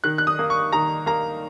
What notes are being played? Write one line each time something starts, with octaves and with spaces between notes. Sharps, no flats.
D#3 F#6
F#6
D#6
A#3
C#6
D#3 A#5
A#3 A#5